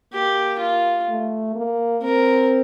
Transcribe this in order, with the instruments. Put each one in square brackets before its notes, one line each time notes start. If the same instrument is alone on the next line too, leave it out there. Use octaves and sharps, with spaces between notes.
[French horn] A#3 [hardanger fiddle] G4
[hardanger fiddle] F4
[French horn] A3
A#3
[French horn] C4 [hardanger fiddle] A#4